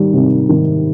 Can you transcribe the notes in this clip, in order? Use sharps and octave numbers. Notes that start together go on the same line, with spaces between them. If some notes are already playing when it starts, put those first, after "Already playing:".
Already playing: D#3 G3
C3
D#3